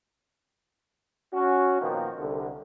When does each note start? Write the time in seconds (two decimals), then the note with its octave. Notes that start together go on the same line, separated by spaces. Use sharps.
1.34 C#4 F#4
1.81 A#2 D#3 F3 A#3 B3
2.18 C2 D3